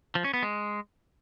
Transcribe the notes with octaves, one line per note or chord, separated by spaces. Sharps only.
F3
C#4
B3
G#3